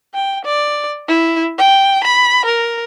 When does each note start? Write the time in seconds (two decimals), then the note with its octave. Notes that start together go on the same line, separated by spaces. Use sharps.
0.14 G5
0.45 D5
1.08 E4
1.58 G5
2.04 B5
2.45 A#4